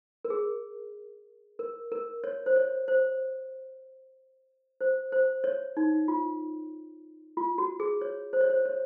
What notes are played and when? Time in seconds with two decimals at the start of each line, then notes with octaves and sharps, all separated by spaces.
0.25 A#4
0.30 G#4
1.59 A#4
1.92 A#4
2.24 C#5
2.46 C5
2.56 C#5
2.88 C5
4.81 C5
5.12 C5
5.44 C#5
5.77 D#4
6.08 F4
7.37 F4
7.58 F#4
7.80 G#4
8.01 C#5
8.33 C5
8.41 C#5
8.50 C5
8.65 C#5